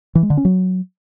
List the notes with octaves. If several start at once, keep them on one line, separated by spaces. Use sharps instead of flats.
E3
G#3
D3
C#4
F#3